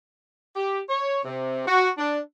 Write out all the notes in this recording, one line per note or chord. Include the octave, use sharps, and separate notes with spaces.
G4
C#5
C3
F#4
D4